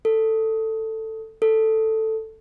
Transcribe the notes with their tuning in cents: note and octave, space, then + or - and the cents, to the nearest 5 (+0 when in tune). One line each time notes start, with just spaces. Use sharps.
A4 +10
A4 +5